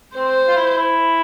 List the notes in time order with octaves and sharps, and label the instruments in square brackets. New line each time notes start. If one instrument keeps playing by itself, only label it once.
[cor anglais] C4 [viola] C5
[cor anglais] F4
E4
E4